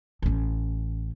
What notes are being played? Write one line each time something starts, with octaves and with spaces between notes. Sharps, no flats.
A1 C#4